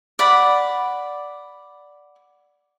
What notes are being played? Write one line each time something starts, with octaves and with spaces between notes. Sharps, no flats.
D5 F#5 B5